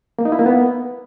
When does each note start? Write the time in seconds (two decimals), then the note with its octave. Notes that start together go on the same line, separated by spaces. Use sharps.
0.19 A#3
0.25 D#4
0.32 E4
0.39 A#3
0.46 B3